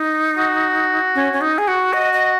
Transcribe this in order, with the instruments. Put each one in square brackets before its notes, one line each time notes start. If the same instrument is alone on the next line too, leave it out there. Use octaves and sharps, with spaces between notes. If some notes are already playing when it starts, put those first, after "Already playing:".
Already playing: [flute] D#4
[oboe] F#4
[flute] C#4
C#4
D#4
G#4
F#4
[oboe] F#4 [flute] D#5
[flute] D#5